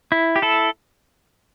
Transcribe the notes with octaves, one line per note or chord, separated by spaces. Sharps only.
E4
G4
E4 A4